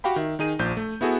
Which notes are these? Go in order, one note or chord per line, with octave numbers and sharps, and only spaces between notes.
F#4 G4 F5 G5 B5
D#3 E5
D#3 D#4 G#4 D#7
A#1 F3 G6
A3
B3 E4 F#4 G#4 A4